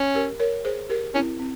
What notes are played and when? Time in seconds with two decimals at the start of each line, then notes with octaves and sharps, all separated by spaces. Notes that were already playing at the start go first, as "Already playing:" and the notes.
Already playing: C#4
0.15 G4 A#4
0.40 A#4 C#5
0.65 G#4 C5
0.90 G4 A#4
1.14 C4 C#4 E4
1.39 C4